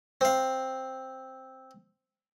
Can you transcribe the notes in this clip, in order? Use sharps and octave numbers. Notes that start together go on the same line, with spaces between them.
C4 F5